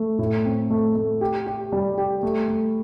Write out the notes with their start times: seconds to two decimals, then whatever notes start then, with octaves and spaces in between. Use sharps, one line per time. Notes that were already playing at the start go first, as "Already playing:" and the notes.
Already playing: A3
0.19 A2
0.44 C4
0.70 A3
0.95 A3
1.21 G4
1.46 G4
1.72 G3
1.98 G4
2.23 A3
2.48 A3